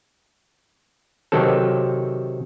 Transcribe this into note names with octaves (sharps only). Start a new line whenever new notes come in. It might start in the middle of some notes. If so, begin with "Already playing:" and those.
C3 D#3 F#3 C4 A4